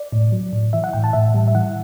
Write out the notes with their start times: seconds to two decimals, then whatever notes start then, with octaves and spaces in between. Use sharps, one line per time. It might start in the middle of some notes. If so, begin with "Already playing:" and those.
Already playing: D5
0.12 A2
0.32 F#3
0.53 A2
0.73 E3 E5
0.84 F#5
0.93 A2 G5
1.04 A5
1.13 A2 E5
1.34 G3
1.48 E5
1.55 E3 F#5